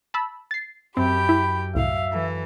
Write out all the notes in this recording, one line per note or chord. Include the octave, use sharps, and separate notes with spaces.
A5 B5 E6
A6 C7
F#2 C4 G4 G5 A5 B5
E4
C2 A2 E5 F5
E3 A4